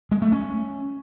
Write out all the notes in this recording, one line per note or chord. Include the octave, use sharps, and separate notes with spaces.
G#3
A3
C#4